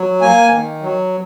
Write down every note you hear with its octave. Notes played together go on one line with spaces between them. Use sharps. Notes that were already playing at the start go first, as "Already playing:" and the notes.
Already playing: F#3
A#3 G#5
D#3
F#3